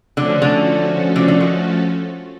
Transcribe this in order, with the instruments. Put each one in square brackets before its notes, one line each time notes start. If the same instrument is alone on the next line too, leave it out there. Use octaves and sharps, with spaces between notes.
[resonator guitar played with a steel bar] D3 [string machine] F3 A3 C#4 F#4 A4
[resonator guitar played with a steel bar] D3
D3
D3
D#3